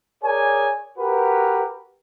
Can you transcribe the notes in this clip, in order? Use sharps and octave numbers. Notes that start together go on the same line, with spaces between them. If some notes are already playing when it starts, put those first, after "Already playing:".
G#4 A#4 C#5 D5 G#5
F#4 G4 A#4 B4